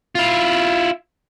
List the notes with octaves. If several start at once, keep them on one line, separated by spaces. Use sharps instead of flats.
E4 F4